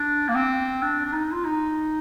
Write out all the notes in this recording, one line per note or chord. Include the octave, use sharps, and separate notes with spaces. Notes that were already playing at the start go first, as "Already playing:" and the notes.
Already playing: D4
A#3
C4
D4
D4
D#4
F4
D#4